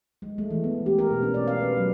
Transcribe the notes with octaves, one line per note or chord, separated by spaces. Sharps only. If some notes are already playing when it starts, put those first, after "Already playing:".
G#3
A3
E3
B3
G4
A#4
B2
C#4
D5
F5
B4
F#3